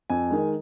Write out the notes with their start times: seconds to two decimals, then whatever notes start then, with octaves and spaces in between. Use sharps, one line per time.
0.10 F2 G#5
0.31 D#3 G#3